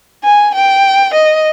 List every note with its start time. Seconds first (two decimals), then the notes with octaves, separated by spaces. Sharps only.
0.24 G#5
0.55 G5
1.14 D#5